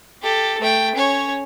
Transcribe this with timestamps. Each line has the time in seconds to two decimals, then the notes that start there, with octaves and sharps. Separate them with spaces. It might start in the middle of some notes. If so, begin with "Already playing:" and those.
0.22 G4 A4
0.60 A3 G5
0.95 C#4 C#5